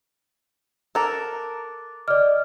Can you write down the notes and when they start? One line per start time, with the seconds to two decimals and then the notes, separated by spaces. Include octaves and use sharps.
0.95 A4 A#4 D6 F#6 A6
2.08 D5 D#5 D6 F6